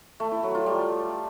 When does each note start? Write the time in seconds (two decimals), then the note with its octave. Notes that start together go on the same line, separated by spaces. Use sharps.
0.20 A3
0.31 E4
0.43 F#3
0.55 F4
0.66 G3